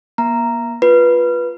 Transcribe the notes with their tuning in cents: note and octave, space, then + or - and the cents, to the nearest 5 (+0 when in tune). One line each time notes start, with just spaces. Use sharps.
A#3 +40 A#5 +0
F4 +0 B4 -10